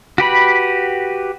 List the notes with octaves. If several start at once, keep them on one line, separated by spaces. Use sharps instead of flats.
F#4 G4 B4 B5